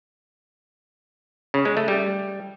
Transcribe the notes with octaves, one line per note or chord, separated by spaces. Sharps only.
C#3
G#3
A3
G3